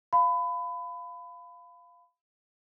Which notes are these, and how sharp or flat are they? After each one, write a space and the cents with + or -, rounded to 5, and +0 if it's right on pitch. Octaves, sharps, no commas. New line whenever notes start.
F5 +0 B5 +25